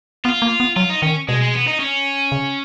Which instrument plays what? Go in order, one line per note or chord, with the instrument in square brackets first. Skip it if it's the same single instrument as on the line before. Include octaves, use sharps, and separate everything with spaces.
[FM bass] B3 [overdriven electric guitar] F4
[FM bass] A#3
B3
[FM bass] F#3 [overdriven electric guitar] F4
[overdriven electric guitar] D#4
[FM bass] D#3 [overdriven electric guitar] C#4
[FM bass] B2 [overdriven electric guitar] G#3
[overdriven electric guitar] G#3
B3
D#4
C#4
[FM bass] C#3